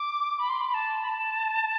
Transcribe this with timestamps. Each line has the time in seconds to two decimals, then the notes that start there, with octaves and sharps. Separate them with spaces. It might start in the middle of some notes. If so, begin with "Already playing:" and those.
Already playing: D6
0.39 B5
0.48 C6
0.58 B5
0.69 B5
0.74 A5
1.04 B5
1.08 A5